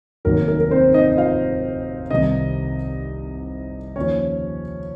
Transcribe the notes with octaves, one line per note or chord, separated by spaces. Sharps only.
F1 D#2 D#3 F#3 A#4
A#4
A#4
C4 C5
D#4 D#5
D#5
F4 F5
C2 C3 D#3 D#4 D#5
D#2 C#3 F3 C#4 C#5